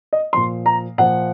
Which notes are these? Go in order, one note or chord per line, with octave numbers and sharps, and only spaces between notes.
D#5
A#2 F3 C6
A#5
A#2 F3 F#5